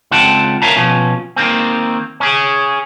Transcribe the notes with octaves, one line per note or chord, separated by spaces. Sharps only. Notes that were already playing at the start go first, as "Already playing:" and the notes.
C#2 C4 F4 F#5 G5 A5
A#4 C#5 E5 F5 A5 A#5
B2 F3 C#4
D#3 A#3 C4
C#4 G#4